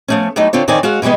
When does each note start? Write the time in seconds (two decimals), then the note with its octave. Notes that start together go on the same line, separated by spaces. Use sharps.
0.08 F3 A3 C#4
0.36 F#3 G3 A3 D#4 E4
0.53 D3 C4 F4 C#5
0.68 F2 D#3 C4 C#5 D5 G#5
0.83 G#3 F#4 F5 F#5
1.02 B2 E3 G3 G#3 B3